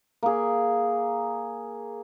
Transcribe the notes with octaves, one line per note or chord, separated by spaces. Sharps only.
A#3 G#4